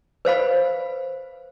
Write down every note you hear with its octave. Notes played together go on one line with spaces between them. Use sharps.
B4 C5 F5 B5